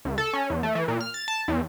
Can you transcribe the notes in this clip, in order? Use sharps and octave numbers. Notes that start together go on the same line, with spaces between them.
C#2
A4
C#4
E2
A3
E3
A#2
F6
A6
A5
E2